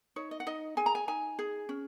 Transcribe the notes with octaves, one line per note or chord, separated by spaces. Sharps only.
D#4 C#5
D#5
F#5
D#4 D#5
G#4 G#5
A#5
G#5
D#4 G#5
G#4
C#4